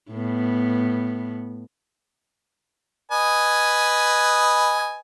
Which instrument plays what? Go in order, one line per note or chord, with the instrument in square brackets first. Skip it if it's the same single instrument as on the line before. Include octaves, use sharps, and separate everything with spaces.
[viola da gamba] A2 B3
[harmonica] B4 D#5 G#5